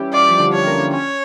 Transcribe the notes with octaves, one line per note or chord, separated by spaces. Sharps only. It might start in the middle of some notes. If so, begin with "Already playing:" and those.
Already playing: E3 G3 C#4 E4 G4
F4 D5
G4
F3 F4
D3 D4
C#5
A#3
C#4 C#5